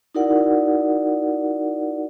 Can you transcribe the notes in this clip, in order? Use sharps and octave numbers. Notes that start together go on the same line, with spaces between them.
D#4 E4 F#4 A#4 D5 F#5